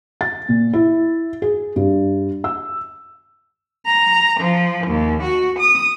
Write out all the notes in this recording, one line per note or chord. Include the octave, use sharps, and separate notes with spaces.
A6
A#2
E4
G#4
G2
E6
A#5
F3
D#2
F#4
D#6